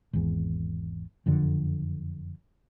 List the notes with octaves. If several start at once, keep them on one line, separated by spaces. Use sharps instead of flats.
G#1 E2
F#1 F2 D3